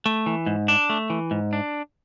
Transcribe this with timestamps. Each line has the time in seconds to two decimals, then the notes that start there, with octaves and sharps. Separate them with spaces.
0.06 A3
0.26 E3
0.46 G#2
0.68 D4
0.90 A3
1.10 E3
1.31 G#2
1.53 D4